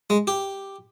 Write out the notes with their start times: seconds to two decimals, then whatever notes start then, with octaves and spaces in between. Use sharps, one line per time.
0.10 G#3
0.27 G4